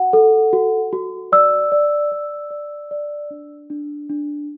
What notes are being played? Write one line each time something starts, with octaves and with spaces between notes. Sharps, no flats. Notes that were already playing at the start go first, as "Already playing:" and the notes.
Already playing: F#4 F#5
A4
F#4
F#4
D5 E6
D5
D5
D5
D5
D4
D4
D4